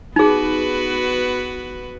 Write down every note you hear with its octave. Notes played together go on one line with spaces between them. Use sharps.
B3 D#4 F#4 G#4 B4